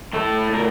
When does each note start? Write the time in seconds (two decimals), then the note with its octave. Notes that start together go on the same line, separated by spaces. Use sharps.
0.13 A2 A3 A4
0.54 A#4